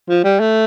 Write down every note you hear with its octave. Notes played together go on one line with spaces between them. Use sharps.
F3
G3
A3